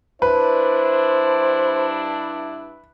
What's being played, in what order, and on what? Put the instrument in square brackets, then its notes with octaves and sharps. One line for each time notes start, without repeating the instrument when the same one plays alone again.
[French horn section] G2 D4 E4 [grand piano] B4 [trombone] C5